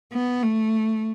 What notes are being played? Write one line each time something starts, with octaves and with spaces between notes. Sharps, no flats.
B3
A3